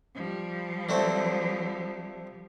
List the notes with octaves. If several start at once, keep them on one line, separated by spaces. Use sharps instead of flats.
F3 G3
D3 A3 C4